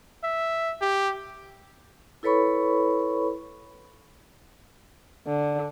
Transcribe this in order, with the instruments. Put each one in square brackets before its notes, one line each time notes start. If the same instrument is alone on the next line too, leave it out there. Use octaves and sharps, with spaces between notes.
[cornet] E5
G4
[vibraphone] E4 A4 B4 C#5 B5 C#6
[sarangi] D3